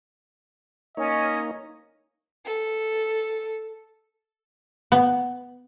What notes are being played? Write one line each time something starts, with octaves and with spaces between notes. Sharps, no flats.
A#3 C#4 D#4 C#5 D#5
A4
B3